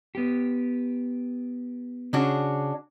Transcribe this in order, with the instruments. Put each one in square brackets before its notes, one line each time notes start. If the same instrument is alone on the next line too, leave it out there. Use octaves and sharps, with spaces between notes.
[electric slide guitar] B3 G4
[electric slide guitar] C#3 G#4 [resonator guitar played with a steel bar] C#4 D4 F#4